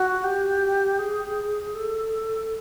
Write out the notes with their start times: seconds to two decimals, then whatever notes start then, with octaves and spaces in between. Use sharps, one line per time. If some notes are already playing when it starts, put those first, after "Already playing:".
Already playing: F#4
0.24 G4
0.99 G#4
1.75 A4